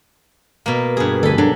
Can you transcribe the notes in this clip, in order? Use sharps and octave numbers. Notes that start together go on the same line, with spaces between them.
B2 A#3
G2 G#4
D2 A4 G#5 B5
F#3 D4